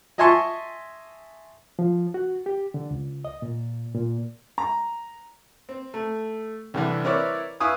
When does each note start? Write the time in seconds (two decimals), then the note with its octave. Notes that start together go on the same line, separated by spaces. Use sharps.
0.18 D#5 E5 G#5 A5 C6 C#6
1.79 F3
2.14 F#4
2.46 G4
2.74 D3
2.91 C#2
3.25 D#5
3.42 A#2
3.94 A#2
4.58 A#5
5.69 C4
5.94 A3
6.74 C2 D3 E3
7.04 C4 E4 A#4 B4 C#5 D5
7.60 E4 B4 F5 G#5 C#6 D#6